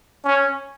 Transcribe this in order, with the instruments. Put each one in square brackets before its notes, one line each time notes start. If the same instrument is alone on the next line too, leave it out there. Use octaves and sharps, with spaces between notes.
[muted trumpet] C#4